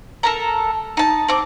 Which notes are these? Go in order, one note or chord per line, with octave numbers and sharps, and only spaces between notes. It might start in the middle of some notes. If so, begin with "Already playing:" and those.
A4 A#4 A#5
D#4 A5
C4 D6